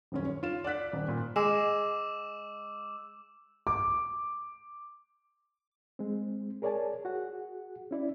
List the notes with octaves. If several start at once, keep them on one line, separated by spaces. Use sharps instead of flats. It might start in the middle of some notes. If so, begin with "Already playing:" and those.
D#1 F#2 C#4
C#5
F4 E7
D5 F#5 F#6 B6
D#1 D5
A#2
G#3 D6 E6 E7
D6
G#3 C4
G#4 A#4 C#5 D5 G#5 A5
F#4 G#4 F#5
C#4 E4 D5